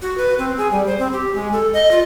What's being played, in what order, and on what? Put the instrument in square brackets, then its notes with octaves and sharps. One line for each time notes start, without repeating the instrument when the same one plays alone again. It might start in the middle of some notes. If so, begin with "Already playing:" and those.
[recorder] F#4
B4
C4
G#4
G3
C5
C4
G4
G#3
A4
D#5
F4